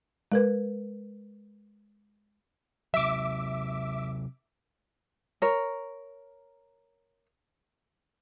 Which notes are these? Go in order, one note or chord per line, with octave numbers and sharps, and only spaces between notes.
G#3 A#4 B4
C3 F#3 E5 D6
A#4 C#5